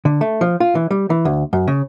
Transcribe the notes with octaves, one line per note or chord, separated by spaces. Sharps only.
D3
A3
F3
F4
E3
G3
E3
D2
F#2
C#3